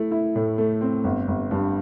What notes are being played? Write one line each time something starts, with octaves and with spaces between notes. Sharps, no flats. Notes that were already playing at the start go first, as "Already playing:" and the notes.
Already playing: A3 E4
E4
A2
A3
C4
G1
G1
G2